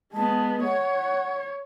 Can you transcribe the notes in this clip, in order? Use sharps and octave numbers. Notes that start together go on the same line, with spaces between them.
G#3 B3 A5
C#5 F#5